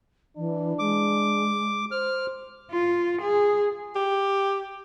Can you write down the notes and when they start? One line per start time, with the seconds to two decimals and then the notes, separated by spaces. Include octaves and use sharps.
0.37 E3 D4
0.79 G#3 D6
1.91 C5 F6
2.72 F4
3.22 G#4
3.95 G4